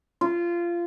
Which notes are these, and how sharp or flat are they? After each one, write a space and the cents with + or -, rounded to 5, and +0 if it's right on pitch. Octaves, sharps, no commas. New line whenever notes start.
F4 -20